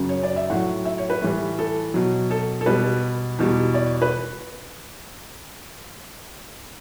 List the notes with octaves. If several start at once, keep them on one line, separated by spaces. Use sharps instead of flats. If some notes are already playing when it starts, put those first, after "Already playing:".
Already playing: F#2 C#3 F#3
C#5
D5
E5
A2 F#3 F#5
E5
C#5
B4
A2 E3 G3
A4
B2 F#3
A4
A4
B2 G3 B4
E2 B2 G3
D5
B4